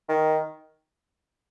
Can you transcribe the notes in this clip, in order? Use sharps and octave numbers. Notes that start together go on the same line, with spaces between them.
D#3